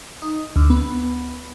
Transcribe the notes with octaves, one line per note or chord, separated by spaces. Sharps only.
D#4
D2
B3